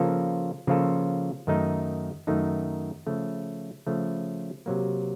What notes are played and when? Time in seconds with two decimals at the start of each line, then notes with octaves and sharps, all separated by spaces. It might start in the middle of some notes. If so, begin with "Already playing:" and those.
Already playing: C#3 F3 A#3 F4 A4
0.67 C#3 F3 A#3 F4 A4
1.47 F#2 D#3 A3 D#4
2.27 F#2 D#3 A3 D#4
3.07 C#3 F3 A3
3.87 C#3 F3 A3
4.66 C3 F#3 A#3